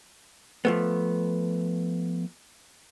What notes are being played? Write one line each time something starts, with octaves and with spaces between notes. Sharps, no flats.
F3 A3 B3